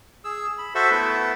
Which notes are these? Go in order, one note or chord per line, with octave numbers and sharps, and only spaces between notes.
G#4 E6
B5
F#4 A4 C5 E5
A3 B3 E4 A4 B4